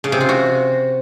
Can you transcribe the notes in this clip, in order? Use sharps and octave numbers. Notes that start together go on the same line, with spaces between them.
C#3
C3
F4
F#4